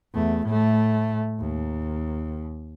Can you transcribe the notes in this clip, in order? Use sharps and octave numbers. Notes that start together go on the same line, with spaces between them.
E2 A3
A2 A3
D#2